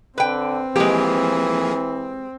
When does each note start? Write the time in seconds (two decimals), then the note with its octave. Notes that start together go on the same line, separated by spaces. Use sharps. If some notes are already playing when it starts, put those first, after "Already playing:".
0.18 D3 C4 B4 G5
0.76 E3 F3 G#3 A#3 G4 G#4